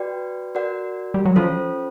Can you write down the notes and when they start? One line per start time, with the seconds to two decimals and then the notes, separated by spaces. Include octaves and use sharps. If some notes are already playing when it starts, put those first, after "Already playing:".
Already playing: F#4 B4 D5 G5
0.55 F#4 A#4 D5 F#5
1.14 G3
1.25 F#3
1.36 F3 C#4 F4 A4 C5